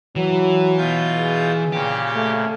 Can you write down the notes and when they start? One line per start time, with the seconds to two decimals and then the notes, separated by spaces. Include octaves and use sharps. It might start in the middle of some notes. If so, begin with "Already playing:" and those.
0.16 E3 F#3
0.78 B2 F4 G6
1.19 G#4
1.73 A#2 C#3 G4
2.15 A3